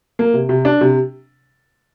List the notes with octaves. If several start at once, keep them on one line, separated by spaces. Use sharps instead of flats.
A#3
C3
C3
D4
C3